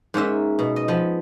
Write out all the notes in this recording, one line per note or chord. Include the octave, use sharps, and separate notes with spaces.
G#2 A#3 C#4 E5
B2
D#5
F3 B3